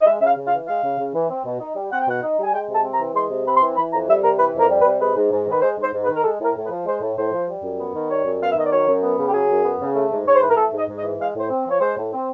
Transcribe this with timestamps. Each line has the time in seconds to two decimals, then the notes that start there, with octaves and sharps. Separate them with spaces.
0.01 D#5
0.06 G#3 E5
0.21 C#3 E5
0.26 F5
0.36 C#3
0.47 F5
0.52 E3
0.67 G#3 F5
0.83 C#3
0.99 C#3
1.15 E3
1.30 C4
1.45 B2
1.60 D#4
1.75 G3
1.91 C4 F#5
2.01 G5
2.07 B2 F#5
2.22 D#4
2.38 G3 G#5
2.53 G#3 G5
2.68 C3
2.74 A5
2.84 C4
2.94 A#5
3.00 E3
3.14 G#3 C6
3.30 C3
3.47 C4 B5
3.56 C6
3.62 E3
3.77 E3 B5
3.92 F2 A#5
4.08 G3 E5
4.23 C3 A#4
4.38 E3 B4
4.55 F2
4.60 A#4
4.70 G3
4.80 B4
4.85 C3
5.00 G#3 B4
5.16 G#2
5.31 G#2
5.47 D#3 B4
5.62 G#3 C5
5.78 G#2 C5
5.94 G#2
6.04 B4
6.09 D#3
6.16 A#4
6.24 G#3 A4
6.40 A2 A#4
6.56 A2
6.66 B4
6.70 F3
6.86 G#3 C5
7.02 A2
7.17 A2 C5
7.33 F3
7.48 G3
7.63 F#2
7.78 B3
7.94 D#3
8.10 G3 C#5
8.25 F#2
8.41 B3 F5
8.50 E5
8.56 D#3 D#5
8.65 D5
8.71 F#3 C#5
8.88 F#2
9.03 B3
9.18 C#3
9.28 G4
9.34 F#3 G#4
9.50 F#2
9.65 B3
9.80 C#3
9.95 A3
10.11 G#2
10.26 G#2 C#5
10.35 C5
10.41 E3 B4
10.50 A#4
10.57 A3 A4
10.73 G#2
10.78 D#5
10.89 G#2
10.98 D#5
11.04 E3
11.19 G#3 F5
11.34 A2
11.40 C5
11.50 C4
11.66 F3 C#5
11.81 G#3 C5
11.97 A2
12.13 C4